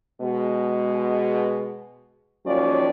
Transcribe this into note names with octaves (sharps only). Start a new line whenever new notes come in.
B2 G#3
D#2 F3 F#3 C#4 D5